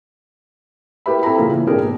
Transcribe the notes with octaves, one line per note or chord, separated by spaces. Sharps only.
E4 G4 A#4 B4 E5 B5
C4 E4 A4 A#5 B5
A#2 C#3 F3 A#3
E3
G#1 A#2 D4 G4 G#4 A#4
B2